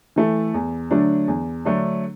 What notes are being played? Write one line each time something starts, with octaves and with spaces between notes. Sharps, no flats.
E3 A3 E4 A4
E2
D3 F#3 A3 D4
E2
D3 F#3 A3 D4